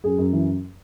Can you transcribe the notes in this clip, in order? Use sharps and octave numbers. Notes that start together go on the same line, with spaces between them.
F#2 G#4
F#2
E3